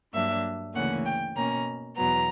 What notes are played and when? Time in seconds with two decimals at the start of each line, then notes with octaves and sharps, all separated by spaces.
0.13 G2 F#3 A#3 D4 E5
0.75 D2 C#3 E3 A#3 C#4 F#5
1.05 G5
1.36 B2 A#3 C#4 A#5
1.97 E2 B2 F#3 B3 A#5